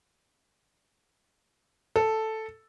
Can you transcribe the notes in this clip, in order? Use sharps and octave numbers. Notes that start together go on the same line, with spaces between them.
A4